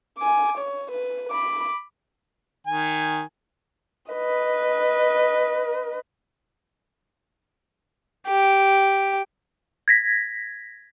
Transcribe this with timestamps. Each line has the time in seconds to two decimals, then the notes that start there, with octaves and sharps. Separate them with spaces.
0.18 G#5 D6
0.57 C#5
0.91 B4
1.31 B5 D6
2.67 D#3 G#5
4.12 B4 D#5
8.27 G4
9.88 G#6 A#6 B6